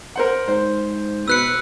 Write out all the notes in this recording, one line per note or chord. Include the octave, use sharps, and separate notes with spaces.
A#4 C5 F#5
G#2 C5
B2 B4 E6 F#6 C#7